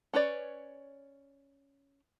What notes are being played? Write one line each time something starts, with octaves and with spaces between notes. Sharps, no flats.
C#4 B4 C#5 D5